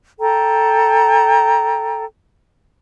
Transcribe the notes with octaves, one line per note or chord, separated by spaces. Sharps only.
A4 G5 A#5